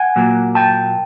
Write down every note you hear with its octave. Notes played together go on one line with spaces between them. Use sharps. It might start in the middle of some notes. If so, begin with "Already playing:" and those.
Already playing: F#5 G#5
A#2 F#3 A#3
G5 A5